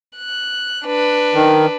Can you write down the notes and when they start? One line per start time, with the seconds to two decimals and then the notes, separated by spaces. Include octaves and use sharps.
0.17 F#6
0.86 D4 B4
1.34 D#3